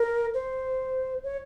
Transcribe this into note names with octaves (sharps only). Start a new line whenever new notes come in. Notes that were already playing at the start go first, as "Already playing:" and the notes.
Already playing: A#4
C5
C#5